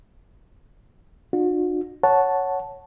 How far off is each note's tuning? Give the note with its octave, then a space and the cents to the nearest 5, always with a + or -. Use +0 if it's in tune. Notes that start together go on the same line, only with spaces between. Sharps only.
D4 +45 F#4 -45
C#5 +0 F#5 +0 A5 +0